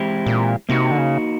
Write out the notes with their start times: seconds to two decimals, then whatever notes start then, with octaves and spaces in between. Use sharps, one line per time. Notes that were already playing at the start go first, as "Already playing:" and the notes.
Already playing: E3 G#3 C4 E4 G4
0.27 A#2
0.69 C3 A#3 D#4 F#4
0.91 D3
0.98 C#3